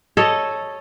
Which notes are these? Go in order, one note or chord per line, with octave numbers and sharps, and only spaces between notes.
A4 C#5 D#5